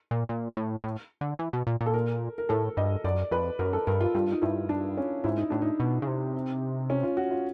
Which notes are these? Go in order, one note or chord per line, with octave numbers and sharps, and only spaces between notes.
A#2
A#2
A2
A2
D3
E3
B2
A#2
A#2
A4
A#4
A#4
A2 A4
G2 D#5
F#2 D5
F2 B4
F#2 A#4
A4
G2 A#4
F4
G2 F4
D#4
G2 E4
D4
C#4
G#2 E4
D#4
A2 D4
D#4
B2
C#3
C3
C#4
F4
F#4
F4